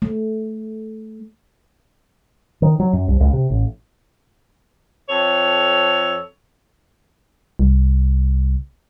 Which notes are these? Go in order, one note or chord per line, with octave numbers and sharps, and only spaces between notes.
A3
D#3
F#3
F#2
C2
C#2
C3
A1
F2 A4 C#5
C2